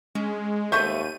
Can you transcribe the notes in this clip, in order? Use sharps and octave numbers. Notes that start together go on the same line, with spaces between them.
G#3 C#4
D#2 A3 C5 E5 C#6 G6 D#7